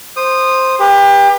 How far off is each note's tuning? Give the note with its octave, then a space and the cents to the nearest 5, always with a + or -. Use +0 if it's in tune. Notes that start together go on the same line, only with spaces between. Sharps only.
C5 +0 D#6 -15
G4 +30 B4 -20